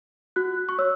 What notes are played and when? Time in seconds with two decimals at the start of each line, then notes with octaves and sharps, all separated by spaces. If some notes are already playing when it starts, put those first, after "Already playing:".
0.36 F#4 F#6
0.69 C#6
0.79 C#5 E6